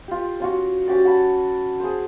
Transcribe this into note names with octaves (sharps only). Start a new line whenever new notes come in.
F4 G4
C#4 F4 F#4
C#4 F#4 G4 D5
C#5 F#5 A5 B5
G#4 C5